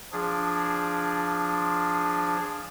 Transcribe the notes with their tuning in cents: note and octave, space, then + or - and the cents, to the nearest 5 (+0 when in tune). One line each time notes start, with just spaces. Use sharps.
F3 +0 D4 +0 G#4 +0